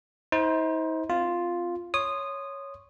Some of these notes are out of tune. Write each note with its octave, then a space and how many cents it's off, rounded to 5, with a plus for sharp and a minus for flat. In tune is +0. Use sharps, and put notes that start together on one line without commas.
D#4 +45 C5 +0
C4 +0 F4 +0
C#5 +0 C6 +0 D#6 -15